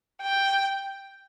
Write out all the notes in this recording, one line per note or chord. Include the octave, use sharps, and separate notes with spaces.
G5